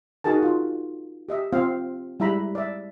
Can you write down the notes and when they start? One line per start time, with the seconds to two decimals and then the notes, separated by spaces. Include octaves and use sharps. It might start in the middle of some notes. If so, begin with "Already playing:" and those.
0.24 D#4 F#4 G#4 A#4 A5
0.43 F4
1.29 G4 D#5 E5
1.53 C4 F4 F5
2.20 G3 G#3 E4 E5 A#5 B5
2.55 D5 E5